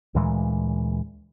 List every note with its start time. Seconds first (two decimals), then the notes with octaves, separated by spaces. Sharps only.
0.15 D2 A#2 E3 G#3